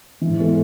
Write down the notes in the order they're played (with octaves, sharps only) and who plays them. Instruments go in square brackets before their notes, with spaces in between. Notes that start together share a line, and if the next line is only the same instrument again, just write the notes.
[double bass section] G#2 [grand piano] E3
[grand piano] B3 E4 A4